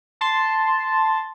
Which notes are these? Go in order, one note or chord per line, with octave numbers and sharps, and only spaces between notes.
A5 C6